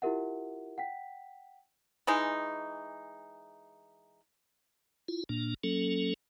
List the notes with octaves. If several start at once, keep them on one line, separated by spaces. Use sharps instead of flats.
E4 F4 G4 A#4 E5 F#5
F#5 G5 B6
E3 G#3 D#4
E4 F4
A#2 A#3 D4
F#3 A#3 C#4 A4